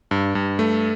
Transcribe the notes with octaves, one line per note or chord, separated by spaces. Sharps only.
G2
G2
A3